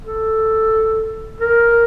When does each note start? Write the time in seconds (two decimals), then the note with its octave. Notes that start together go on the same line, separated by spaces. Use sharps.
0.05 A4
1.40 A#4